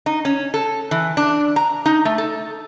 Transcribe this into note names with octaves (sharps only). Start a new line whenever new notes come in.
D#4
C#4
A4
E3
D4
A#5
D#4
A3
A4